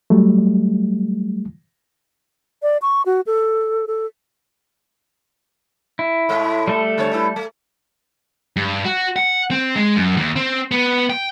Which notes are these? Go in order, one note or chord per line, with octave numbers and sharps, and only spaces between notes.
F#3 G3 A3
D5
C#6
F#4
A4
A4
E4
A2 G#3 E5
G3 A3 A4
D3 C4 C#5
D4 E4 B4
A3
G2
F#4
F#5
C4
G#3
F#2
D#2
C4
B3
G5